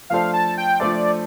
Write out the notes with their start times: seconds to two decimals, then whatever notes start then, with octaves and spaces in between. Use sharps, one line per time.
0.10 F3 A3 D4 A4 C5 F5
0.33 A5
0.58 G5
0.80 F3 A3 D4 A4 C5 D5